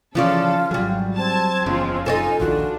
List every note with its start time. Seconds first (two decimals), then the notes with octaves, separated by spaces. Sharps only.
0.15 C#3 E3 F3 C#4 F4 A4 D5
0.71 G#1 F#3 G3 G#4
1.17 C4 A5 G#6
1.66 F#1 E2 C#3 F3 G#3 F4
2.06 D#4 F4 A4 C#5 D#5 G#5
2.40 A#1 D#2 D#3 D4 F4 F#4